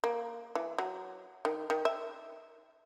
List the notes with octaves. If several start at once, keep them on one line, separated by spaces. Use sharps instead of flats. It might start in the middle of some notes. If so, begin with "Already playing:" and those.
A#3
E3
F#3
D#3
D#3
E5